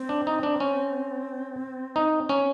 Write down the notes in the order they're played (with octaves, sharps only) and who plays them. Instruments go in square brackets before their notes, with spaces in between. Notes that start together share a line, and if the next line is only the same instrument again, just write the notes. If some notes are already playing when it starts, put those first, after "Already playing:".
Already playing: [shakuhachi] C4
[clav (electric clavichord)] D4
D#4
D4
C#4
D#4
C#4